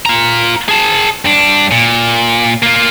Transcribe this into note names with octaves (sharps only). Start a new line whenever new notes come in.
F4 A#5
G#4 A5
G2 D4
A#2
A#3 F4